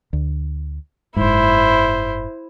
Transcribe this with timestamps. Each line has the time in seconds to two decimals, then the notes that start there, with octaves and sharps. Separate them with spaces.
0.13 D2
1.16 F#1 G#2 E4 C5